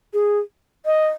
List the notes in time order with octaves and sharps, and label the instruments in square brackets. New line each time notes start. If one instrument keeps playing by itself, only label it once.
[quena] G#4
[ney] D#5